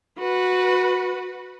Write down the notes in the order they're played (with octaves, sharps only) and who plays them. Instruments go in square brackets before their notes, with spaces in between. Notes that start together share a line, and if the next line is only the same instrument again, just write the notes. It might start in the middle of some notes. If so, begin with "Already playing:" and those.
[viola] F#4 B4